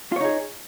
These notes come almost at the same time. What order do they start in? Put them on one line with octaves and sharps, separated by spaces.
F4 C#5 D#4 G#4